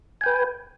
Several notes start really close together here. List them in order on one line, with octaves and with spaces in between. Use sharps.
G#5 G5 B4